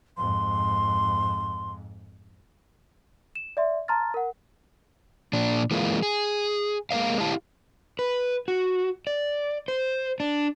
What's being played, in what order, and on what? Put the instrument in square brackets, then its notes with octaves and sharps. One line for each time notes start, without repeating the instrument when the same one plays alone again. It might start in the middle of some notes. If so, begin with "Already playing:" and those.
[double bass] F2 G#2 [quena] C6
[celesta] E7
D5 E5 C6
A5 A#5 C6 F6 A6
A#4 F#5
[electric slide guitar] A#2 D4
E3 G#3 A#3 F4
G#4
G#3 A#3 B4 D#5 F5
E4 G4 F5 A5
B4
F#4
D5
C5
D4